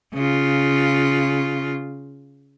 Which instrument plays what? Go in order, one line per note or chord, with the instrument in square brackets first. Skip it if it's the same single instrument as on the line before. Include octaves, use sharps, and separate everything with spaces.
[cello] C#3 F4